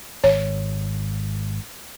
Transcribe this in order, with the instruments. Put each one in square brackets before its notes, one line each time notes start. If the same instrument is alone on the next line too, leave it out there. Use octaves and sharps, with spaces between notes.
[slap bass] G#1 [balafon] C#5